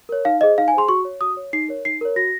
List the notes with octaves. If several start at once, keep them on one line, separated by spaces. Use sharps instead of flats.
A#4 C#5
D#4 F5
G#4 C5 D#5
D#4 F5
G#5
G#4 C5 C6
F#4 C#6
C#5
F#4 D#6
C#5
D#4 C7
A#4 C#5
D#4 C7
A#4 C#5
F#4 A#6